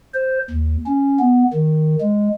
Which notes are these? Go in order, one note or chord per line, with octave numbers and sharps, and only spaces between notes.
C5
D#2
C#4
B3
D#3
G#3